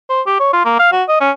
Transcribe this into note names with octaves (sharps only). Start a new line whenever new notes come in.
C5
G4
C#5
F4
A#3
F5
F#4
D#5
C#4